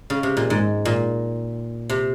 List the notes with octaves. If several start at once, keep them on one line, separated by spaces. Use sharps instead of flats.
C#3
C3
A#2
G#2
A#2
C3